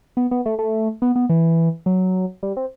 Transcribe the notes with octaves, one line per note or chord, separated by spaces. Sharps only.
B3
B3
A3
A3
B3
B3
E3
F#3
G3
C4